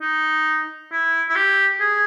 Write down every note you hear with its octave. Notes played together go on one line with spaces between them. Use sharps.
D#4
E4
E4
G4
G#4